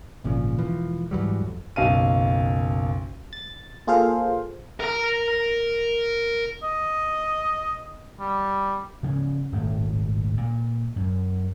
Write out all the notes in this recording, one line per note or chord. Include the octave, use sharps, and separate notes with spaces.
G#1 A#2 C#3 F3
E1 E3 F3
G#2 E3 F#3 G3
F2
F#1 B1 F5 D#7
A6
A#3 F4 G#4 A4 C5 F5
A#4 A#5
D#5
G3
C#3 F3 A3 C#4
D#1 G#1 A2 A3
A#2
F#2